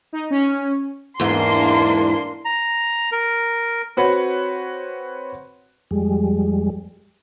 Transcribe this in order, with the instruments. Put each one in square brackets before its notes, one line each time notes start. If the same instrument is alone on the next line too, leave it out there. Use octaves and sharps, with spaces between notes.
[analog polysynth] D#4
C#4
[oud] E2 G#2 [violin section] A#3 D4 C6
[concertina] A#5
A#4
[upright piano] C4 F#4 B4 C#5 F#5 B5
[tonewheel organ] F2 G3 G#3